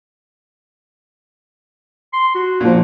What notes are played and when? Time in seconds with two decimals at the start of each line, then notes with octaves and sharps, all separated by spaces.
2.13 C6
2.35 F#4
2.60 A#2 F3